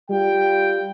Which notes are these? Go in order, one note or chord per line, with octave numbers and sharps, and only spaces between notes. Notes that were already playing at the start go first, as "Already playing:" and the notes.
G3 F4 G5